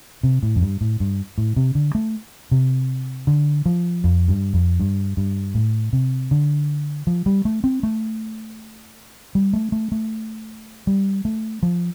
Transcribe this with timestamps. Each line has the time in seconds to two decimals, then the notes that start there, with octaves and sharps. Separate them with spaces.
0.23 C3
0.43 A2
0.56 F2
0.62 G2
0.81 A2
1.00 G2
1.38 A2
1.56 C3
1.75 D3
1.95 A3
2.51 C3
3.27 D3
3.66 F3
4.04 F2
4.28 G2
4.54 F2
4.80 G2
5.17 G2
5.55 A2
5.93 C3
6.31 D3
7.07 F3
7.26 G3
7.45 A3
7.64 C4
7.83 A3
9.35 G3
9.53 A3
9.72 A3
9.92 A3
10.87 G3
11.25 A3
11.63 F3